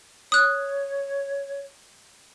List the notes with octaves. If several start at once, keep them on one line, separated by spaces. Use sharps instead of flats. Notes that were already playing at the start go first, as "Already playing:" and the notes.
C#5 D#6 F#6